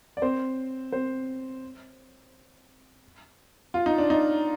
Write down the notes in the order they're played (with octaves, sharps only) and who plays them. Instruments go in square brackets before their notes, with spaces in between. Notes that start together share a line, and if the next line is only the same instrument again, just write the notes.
[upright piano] D5
C4 C5
C4 C5
F4
D#4
D4
D#4